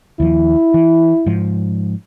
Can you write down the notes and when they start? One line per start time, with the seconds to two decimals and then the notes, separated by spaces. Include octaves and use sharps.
0.20 D#2 F3 E4
0.74 E3
1.26 G#2 F3